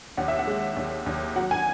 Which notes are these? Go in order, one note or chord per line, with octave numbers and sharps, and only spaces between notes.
D#2 F#5
E5
F#5
G#3
D#2
D#2
F#3 F#5
G#5